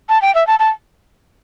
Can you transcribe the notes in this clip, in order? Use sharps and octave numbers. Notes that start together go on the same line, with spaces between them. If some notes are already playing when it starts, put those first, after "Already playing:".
A5
G5
E5
A5
A5